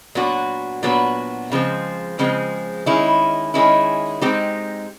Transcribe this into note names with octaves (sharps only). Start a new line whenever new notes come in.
A#2 F#3 B3 D4 F#4
A#2 F#3 B3 D4 F#4
C#3 F3 G#3 C4
C#3 F3 G#3 C4
D#3 G#3 C#4 E4
D#3 G#3 C#4 E4
G#3 C4 D#4 G4